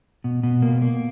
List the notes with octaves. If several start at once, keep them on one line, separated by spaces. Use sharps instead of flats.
B2
B2
A#3
A#3